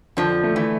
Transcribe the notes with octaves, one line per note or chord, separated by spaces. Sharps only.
F2 D3 F3
A3
E3